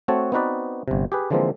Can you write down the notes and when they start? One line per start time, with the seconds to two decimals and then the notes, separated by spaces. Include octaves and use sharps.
0.08 A3 C4 F#4 C#5 F#5 A5
0.32 B3 C4 D#4 F#4 B4 D5
0.88 G1 C3
1.12 G4 G#4 B4
1.31 D3 E3 F3 G#3 A#3 C4